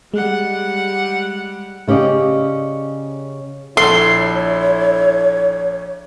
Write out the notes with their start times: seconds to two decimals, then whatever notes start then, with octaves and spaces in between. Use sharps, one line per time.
0.14 G3 G#3 F#5
1.88 C#3 C#4 G4 D5 D#5
3.77 A#1 E4 A4 C#5 C6